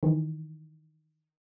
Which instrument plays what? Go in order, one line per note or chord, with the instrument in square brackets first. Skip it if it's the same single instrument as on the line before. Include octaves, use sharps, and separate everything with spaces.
[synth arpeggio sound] D#3 E3